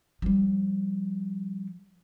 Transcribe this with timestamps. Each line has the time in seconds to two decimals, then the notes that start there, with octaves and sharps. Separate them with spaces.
0.22 F3 G3